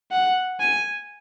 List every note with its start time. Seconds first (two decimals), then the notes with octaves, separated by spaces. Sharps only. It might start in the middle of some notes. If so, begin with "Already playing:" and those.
0.11 F#5
0.60 G#5